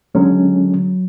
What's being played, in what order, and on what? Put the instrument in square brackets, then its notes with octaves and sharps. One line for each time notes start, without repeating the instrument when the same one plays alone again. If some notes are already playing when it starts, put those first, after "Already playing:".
[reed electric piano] D3 G#3 C#4 [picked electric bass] F#3